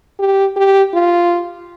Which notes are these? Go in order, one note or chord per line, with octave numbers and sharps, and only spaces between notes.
G4
G4
F4